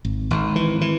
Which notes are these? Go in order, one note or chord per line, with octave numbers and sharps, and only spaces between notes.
G#1
G#1
E3
E3